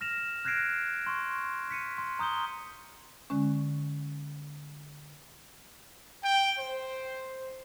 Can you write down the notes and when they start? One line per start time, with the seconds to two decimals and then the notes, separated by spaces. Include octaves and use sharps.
0.01 F6 A#6 E7 F7
0.45 F6 F#6 G#6 A#6 C7 D7
1.06 C6 C#6
1.70 B6 C#7 D#7
1.98 C6
2.19 A#5 D#6 G6 G7
3.30 D3 G#3 C#4
6.24 G5
6.59 C5